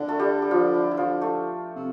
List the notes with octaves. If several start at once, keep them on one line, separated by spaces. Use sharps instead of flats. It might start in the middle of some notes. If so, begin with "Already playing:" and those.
Already playing: D3 D4
A3 A4
G3 G4
G4
F3 F4
E4
E4
F3 F4
A3 A4
C3